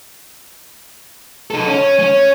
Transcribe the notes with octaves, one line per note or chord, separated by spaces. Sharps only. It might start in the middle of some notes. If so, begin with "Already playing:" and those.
D#4 A4
C#4
C#4